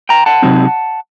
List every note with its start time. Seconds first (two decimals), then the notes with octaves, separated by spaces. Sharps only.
0.09 G5 A#5
0.26 F#5 A5
0.42 C3 F#3 C4 D#4